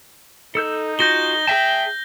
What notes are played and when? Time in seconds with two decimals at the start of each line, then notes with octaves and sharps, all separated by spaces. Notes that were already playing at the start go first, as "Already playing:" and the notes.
0.55 D#4 A4 E6 G6
0.99 F4 F#4 G#4 G6 A#6 G7
1.47 G#4 E5 G5 A5